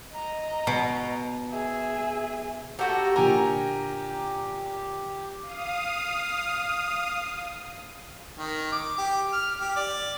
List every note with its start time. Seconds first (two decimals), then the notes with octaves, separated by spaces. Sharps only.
0.13 D#5 A#5
0.67 B2
1.52 G#4 E5
2.79 A3 F#4 G4 A4 F#5 A#5
3.16 A#2 D3 G4 A#4 G5 G#5 A#5
5.43 F5 D#6
8.39 D#3
8.72 D6
8.98 G4
9.33 F6
9.61 G4
9.76 D5